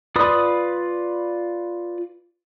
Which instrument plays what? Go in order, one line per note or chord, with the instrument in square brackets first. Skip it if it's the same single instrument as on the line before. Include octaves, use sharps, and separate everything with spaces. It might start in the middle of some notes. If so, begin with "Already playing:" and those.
[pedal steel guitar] F4 B4 D5 B5 D#6